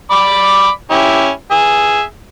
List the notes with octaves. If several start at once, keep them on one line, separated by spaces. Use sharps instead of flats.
D5 B5 D6
C#4 E4 G4
G#4 E5